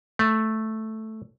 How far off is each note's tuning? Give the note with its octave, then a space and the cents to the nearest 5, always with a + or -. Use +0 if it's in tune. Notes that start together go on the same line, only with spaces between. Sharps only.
A3 +0